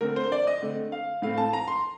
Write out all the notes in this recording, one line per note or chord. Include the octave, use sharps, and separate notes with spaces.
D3 A3 C4 A#4
C5
D5
D#5
D3 A3 C4
F5
A2 A3 C4 F5
A5
A#5
C6